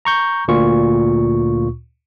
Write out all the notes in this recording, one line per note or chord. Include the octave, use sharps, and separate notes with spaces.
A#5 C#6 G6
D2 A#2 F4 C#6